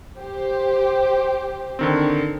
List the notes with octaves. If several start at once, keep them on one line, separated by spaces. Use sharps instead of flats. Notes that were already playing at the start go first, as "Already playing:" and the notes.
G4 C5
D3 D#3 C4